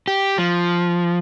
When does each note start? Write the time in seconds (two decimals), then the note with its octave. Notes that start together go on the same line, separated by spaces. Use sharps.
0.08 G4
0.38 F3